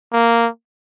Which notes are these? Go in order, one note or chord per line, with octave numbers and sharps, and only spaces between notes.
A#3